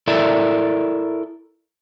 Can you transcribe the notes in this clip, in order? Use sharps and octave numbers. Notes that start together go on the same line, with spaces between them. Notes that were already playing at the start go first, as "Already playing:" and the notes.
E4 A4 A#4 D5 E5